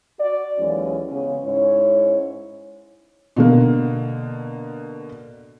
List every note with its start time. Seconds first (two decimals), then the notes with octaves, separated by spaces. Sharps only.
0.20 F#4 D5
0.59 D#2 E3 F#3 G#3 C#4
1.11 C#3 G#3 B3 C#4
1.44 G#2 C#4 E4 C#5
3.36 B2 D3 A#3